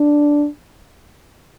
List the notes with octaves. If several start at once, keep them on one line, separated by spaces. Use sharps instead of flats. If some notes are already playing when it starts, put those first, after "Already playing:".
Already playing: D4